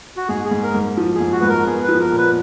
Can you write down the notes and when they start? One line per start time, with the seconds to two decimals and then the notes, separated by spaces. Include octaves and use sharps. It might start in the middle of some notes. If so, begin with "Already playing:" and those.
0.17 F#4
0.29 G#2 G#4
0.45 G#4
0.51 G#2
0.63 A#4
0.74 G#2
0.97 F3
1.15 G#4
1.20 G#2
1.32 F#4
1.41 G#2 B4
1.49 A#4
1.66 B3 G#4
1.83 B4
1.88 F3
2.00 A#4
2.12 A#2
2.18 B4